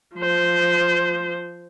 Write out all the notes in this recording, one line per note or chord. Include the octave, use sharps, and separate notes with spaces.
F3 C5